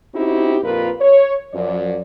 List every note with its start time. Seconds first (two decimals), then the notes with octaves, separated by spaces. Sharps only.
0.14 C4 C#4 D#4 E4 F#4 G4
0.63 F2 A#2 F4 A#4 B4
1.01 C#5
1.54 F#2 F3 D5